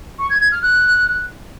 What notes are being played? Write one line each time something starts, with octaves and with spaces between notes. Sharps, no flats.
C#6
G#6
G#6
F6
F#6